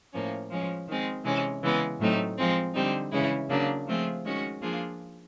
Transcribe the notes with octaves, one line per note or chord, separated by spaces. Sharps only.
A2 F3 A#3 C#4
F3 G#3 C#4
D#3 G#3 C4
C3 E3 G#3 C#4
C#3 E3 G#3 B3
A2 F#3 A3 C4 D#4
F3 G#3 C4
D3 G3 C4 D#4
C#3 E3 G#3 C#4 E4
C#3 F#3 A#3 D4
F3 A3 C4 F4 G#4
D#3 G#3 C#4 F#4
F3 A#3 D4 F4 G#4